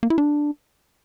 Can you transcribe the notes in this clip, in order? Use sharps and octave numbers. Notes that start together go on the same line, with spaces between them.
A#3
E4
D4